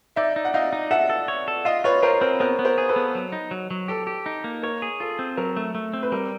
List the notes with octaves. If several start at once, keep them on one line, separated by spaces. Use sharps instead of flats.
D#4 D5 E5
D#4
F#5
D#4 D#5 F5
D#4
A4 E5 F#5
A4
C#5
A4
F4 D#5 F5
F4 B4 C#5
F4 A#4 C5
C4 A#4
B3 A#4 C5
B3
A#4 C5
G#4
A4 B4
B3
F#3
D#4
F#3
F#3
G4 A4
G4
D#4
A#3
A#4 C#5
G#4
F4 A4
C4
F#3 A#4
A3
A3
C4
B4
G3 A#4